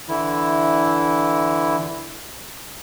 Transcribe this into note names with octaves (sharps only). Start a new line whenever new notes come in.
D3 E3 E4